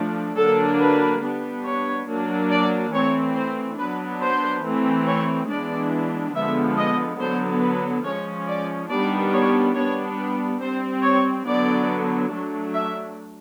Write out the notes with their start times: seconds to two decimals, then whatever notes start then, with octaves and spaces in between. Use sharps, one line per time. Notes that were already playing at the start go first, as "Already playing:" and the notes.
Already playing: F3 A3 D4
0.37 D3 F#3 A#3 D4 A4
0.80 B4
1.22 G3 B3 D4
1.65 C#5
2.07 F#3 A#3 D4
2.50 D5
2.92 E3 A3 C4 C#5
3.36 C5
3.78 F#3 B3 D4 B4
4.21 C5
4.63 E3 A3 C4
5.06 C#5
5.49 E3 G#3 B3 D4 D5
6.34 D3 F3 G#3 B3 E5
6.77 D#5
7.19 D3 F#3 B3 C5
7.62 B4
8.05 F3 G#3 C#4 C#5
8.47 D5
8.89 D#3 G3 B3 D4 D5
9.33 C#5
9.75 G3 B3 D4 C#5
10.18 B4
10.60 G3 C4 C5
11.03 C#5
11.46 D3 F#3 B3 D5
12.31 F#3 A3 D4
12.74 E5